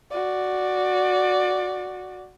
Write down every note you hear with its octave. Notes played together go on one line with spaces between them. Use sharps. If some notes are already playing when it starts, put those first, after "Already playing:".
F#4 D5